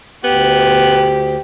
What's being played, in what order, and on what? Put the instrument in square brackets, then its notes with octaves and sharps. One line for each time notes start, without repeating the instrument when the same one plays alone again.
[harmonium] D2 [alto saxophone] B3 [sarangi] G4